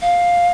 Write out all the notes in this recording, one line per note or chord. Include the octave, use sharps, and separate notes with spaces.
F5